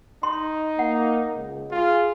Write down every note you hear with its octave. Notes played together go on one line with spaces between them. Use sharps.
D#4 C6
A#3 F#5
C#2
F4 G#4